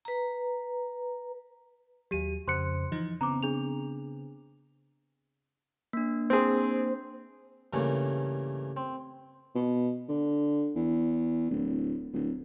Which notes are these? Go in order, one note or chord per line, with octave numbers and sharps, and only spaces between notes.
B4 A#5
D#2 F#3 G4 D#7
F2 C#3 C5 C6 F#6 C#7
E3 F3 D#4
C#3 B3 C4 A#5 D6
D4 G#4 F7
A#3 D4
C4 G#4 C5
G2 C#3 E3 A3 A#3 D4
C4
B2
D3
E2
D1
D1